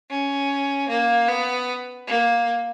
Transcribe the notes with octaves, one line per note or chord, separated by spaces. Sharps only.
C#4
A#3
B3
A#3